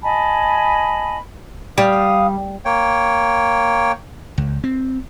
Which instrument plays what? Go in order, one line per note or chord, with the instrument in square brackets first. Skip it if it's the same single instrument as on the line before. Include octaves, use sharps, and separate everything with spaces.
[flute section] D#5 G#5 A5 B5
[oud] G3 [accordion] F5 D#6
[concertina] A#3 C#5 G5
[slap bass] C#2
C4